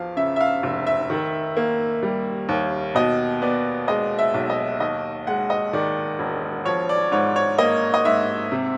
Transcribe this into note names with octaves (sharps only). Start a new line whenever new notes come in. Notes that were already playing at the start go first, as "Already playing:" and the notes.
Already playing: E2 F3 F5
C#3 E5
E5
F5
F1
E5
D#3
A#3
G3
D#2
B2 D#5
B3 D5
G#3 D#5
E5
B1
D#5
D#2 D#5
G#3 F#5
D#5
D#3 D5
E1
F3 C#5
D5
G#2 C#5
C#5
A#3 D#5
D#5
G#2 E5
C3